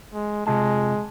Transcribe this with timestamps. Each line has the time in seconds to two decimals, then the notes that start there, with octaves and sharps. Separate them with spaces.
0.13 G#3
0.47 C3 G#3 F4 A5